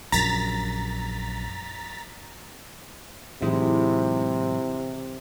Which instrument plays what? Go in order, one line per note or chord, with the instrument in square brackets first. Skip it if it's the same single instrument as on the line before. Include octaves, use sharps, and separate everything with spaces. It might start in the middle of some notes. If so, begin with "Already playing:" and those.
[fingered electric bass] A#1 F#2 [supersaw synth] A#5 A6 B6
[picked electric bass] A2 E3 F#3 [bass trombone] C3 [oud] G#3 D#4 E4